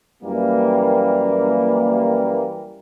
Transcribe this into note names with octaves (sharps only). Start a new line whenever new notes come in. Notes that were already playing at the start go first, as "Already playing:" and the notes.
F#2 E3 G3 A#3